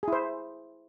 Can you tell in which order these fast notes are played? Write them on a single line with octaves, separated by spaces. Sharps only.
G#4 E4 C5